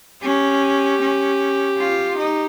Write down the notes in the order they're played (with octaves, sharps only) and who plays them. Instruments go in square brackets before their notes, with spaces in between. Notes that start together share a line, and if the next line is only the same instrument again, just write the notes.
[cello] C#4 [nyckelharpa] G4
[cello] C#4
F4
D#4